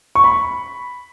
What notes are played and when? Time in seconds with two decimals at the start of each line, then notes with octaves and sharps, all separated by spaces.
0.15 C#6
0.24 B5